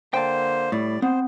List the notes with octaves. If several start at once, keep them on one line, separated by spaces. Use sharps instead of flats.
D3 A#3 C5 G5 A5
A2 G3 D5
B3 C4 C5